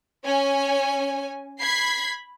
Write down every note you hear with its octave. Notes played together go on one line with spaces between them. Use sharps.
C#4 C#5 G#5
B5 G#6 B6 C7